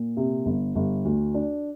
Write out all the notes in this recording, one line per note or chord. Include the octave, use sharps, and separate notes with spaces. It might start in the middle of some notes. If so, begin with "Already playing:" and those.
Already playing: A#2
C3
G1
G1
D2
D4